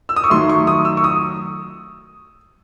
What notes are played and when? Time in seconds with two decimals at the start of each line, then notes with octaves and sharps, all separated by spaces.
0.09 E6
0.16 D#6
0.24 C#6
0.30 D#3 F#3 A3 C6
0.49 C#6
0.67 D#6
0.85 E6
0.97 C#6
1.04 D#6